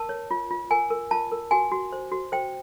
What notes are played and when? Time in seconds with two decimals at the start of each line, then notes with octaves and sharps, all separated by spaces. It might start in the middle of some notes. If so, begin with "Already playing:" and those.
Already playing: A#4 A5
0.09 C#5
0.31 F4
0.51 F4
0.71 A#4 G#5
0.90 A#4
1.11 F4 A5
1.32 A#4
1.51 F#4 G#5
1.72 F#4
1.93 C5
2.12 F#4
2.32 C5 G5